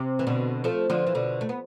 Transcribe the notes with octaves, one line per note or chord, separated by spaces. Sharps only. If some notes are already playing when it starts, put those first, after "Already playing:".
Already playing: C3
E3
B2 D3
F3 A3
D3 F3
E3
B2 D3
A3
B3